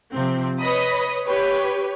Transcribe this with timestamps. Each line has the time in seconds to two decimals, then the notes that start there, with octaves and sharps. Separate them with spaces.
0.14 C3 F3 C4
0.60 B4 C#5 D#5 B5 D#6
1.26 G4 B4 C#5